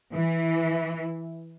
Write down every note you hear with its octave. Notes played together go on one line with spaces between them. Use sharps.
E3